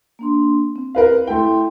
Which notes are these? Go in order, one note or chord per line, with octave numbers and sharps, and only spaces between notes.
A#3 D4 C6
C4
A#4 B4 F5
A3 E4 G5 C6